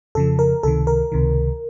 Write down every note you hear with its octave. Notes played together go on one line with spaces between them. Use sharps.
F2 C#3 F3 A4
A#4
C#2 C3 D#3 A4
A#4
C#2 C3 D#3